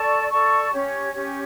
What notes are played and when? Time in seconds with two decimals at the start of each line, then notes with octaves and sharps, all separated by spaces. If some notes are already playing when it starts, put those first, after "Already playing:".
Already playing: A4 D5 A5 C#6
0.30 A4 D5 A5 C#6
0.71 C#4 G4 C#5
1.13 C#4 G4 C#5